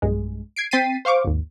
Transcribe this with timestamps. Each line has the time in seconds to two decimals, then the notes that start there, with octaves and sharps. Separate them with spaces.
0.02 B1 G2 G#3
0.56 G#6 C7 D7
0.71 C4 G5 A6 B6 C7 D#7
1.05 C5 F5 C#6 D6
1.24 G#1 D#2